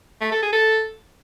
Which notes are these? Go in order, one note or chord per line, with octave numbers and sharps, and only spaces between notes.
A3
A4
G#4
A4